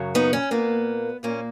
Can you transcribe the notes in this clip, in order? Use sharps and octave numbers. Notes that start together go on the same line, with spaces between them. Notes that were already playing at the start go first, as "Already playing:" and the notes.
Already playing: F#2 C#3 F#3
B3 D#4
C#4
A#2 A#3 B3
A#2 A#3 C#4